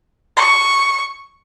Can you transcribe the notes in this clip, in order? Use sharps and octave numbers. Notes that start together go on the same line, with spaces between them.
C#6